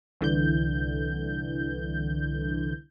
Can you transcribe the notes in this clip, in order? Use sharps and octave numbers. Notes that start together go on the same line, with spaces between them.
C2 D3 E3 G6